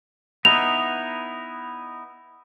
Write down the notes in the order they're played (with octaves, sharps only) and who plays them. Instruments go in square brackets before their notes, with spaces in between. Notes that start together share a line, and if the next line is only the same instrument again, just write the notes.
[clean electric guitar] B3 D#4 E4 [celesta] F7